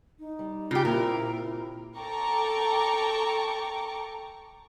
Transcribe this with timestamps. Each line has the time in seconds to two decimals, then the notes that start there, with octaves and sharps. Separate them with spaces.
0.19 D#4
0.39 G3
0.71 C#3 F4 G4
0.85 A#2 C4 E4 A#4
1.98 A4 G5 A#5 C#6 D6